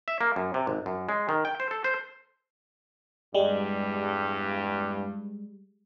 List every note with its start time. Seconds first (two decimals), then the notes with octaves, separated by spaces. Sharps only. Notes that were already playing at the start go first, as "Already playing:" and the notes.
0.08 E5
0.21 A#3
0.36 F#2
0.54 C3
0.67 G#1
0.86 F#2
1.09 G#3
1.29 D#3
1.45 G5
1.60 C5
1.71 A4
1.84 C5
3.34 E2 G2 G3 G#3